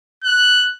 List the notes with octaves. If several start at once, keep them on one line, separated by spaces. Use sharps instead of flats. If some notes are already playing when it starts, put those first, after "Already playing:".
F#6